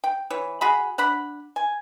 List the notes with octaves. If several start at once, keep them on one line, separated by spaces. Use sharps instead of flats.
G5
E3 C#5
F#4 G#4 B5
D4 F#5 B5
G#5